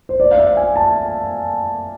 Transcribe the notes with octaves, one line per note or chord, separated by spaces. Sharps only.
C5
D5
F5
E5
G#5
A5